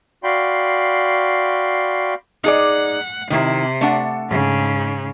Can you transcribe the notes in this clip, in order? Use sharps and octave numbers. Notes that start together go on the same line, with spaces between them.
F#4 D5 F5 G5 B5 C6
D#4 G#4 D5 F#5
C3 D#3 E4
A3 D4 F#5
G#2 C#3